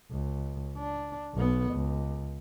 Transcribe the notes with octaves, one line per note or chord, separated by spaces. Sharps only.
C#2
D4
B1 B3
C#2